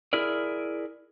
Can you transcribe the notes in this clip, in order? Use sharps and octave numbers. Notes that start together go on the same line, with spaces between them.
E4 G#4 A#4 D5